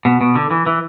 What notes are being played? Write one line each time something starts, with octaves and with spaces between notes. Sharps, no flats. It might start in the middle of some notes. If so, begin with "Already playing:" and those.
B2
B2
D3
E3
E3